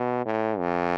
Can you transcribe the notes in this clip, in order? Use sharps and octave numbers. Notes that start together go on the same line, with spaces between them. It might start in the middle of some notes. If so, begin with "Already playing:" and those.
Already playing: B2
A2
F2